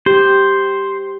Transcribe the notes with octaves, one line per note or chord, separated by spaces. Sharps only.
G4 C5